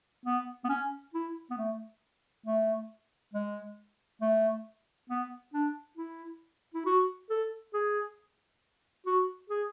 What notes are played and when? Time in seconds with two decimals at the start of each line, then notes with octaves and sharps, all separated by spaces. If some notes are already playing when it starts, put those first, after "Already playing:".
0.26 B3
0.64 B3
0.69 C#4
1.14 E4
1.50 B3
1.58 A3
2.46 A3
3.34 G#3
4.21 A3
5.10 B3
5.54 D4
5.97 E4
6.74 E4
6.86 F#4
7.30 A4
7.74 G#4
9.06 F#4
9.50 G#4